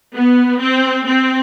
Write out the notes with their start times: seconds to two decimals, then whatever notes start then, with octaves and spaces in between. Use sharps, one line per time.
0.16 B3
0.61 C4
1.07 C4